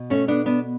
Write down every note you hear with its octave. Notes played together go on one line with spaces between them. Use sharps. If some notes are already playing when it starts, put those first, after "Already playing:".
Already playing: B2
A3 C#4
B3 D4
B3 D4